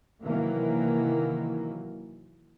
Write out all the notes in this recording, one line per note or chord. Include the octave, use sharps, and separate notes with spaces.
C3 D#3 E3 F#3 A#3